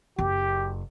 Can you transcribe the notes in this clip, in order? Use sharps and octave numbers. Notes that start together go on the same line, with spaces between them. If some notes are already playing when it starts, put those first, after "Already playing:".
F#1 G4